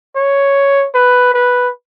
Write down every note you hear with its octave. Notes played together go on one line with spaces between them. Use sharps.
C#5
B4
B4